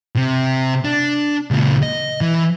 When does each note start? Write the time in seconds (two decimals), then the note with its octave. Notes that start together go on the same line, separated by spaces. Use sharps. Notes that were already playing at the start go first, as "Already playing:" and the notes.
0.16 C3
0.85 D4
1.51 C#2 A#2
1.83 D#5
2.21 E3